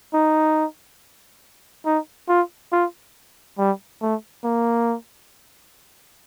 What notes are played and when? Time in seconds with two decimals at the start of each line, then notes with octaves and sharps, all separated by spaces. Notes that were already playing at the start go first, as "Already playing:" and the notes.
0.14 D#4
1.86 D#4
2.29 F4
2.72 F4
3.58 G3
4.02 A3
4.44 A#3